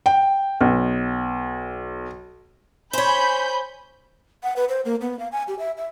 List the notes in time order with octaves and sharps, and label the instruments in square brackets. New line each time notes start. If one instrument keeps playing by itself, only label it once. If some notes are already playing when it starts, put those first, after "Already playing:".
[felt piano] G5
B1
[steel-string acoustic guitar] C5 C#5 [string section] G#5 B5 G6
[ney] F#5
B4
C5
A#3
B3
F5
G#5
G4
E5
E5